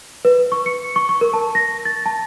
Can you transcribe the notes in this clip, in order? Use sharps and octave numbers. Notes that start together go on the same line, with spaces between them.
B4
C#6
C#7
C#6
C#6
A#4
A5
A#6
A6
A5